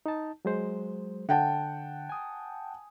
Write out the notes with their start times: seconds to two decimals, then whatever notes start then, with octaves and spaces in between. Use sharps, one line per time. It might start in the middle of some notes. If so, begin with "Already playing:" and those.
0.06 D#4 A5
0.45 F#3 G#3 C5
1.29 D3 F#5 G5 A5
2.09 G#5 D#6